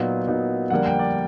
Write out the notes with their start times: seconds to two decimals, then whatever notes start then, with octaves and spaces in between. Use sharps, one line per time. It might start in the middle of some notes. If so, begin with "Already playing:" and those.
Already playing: A#2 F#3 B3 D#4
0.28 A#2 F#3 B3 D#4
0.70 F2 D3 G3 A#3 F#5
0.86 G5
0.99 D5